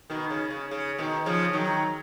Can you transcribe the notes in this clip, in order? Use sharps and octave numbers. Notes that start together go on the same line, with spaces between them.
B2 D#3
C#3
C#3
C#3
B2 D#3
C#3 F3
D#3 F#3